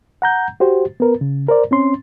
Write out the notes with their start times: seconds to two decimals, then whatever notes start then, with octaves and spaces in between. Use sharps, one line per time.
0.22 F#5 A#5 G6
0.60 F#4 G4 C5
1.00 B3 A#4 B4
1.21 C#3
1.49 A#4 C5 D5
1.71 C4 C#4 C6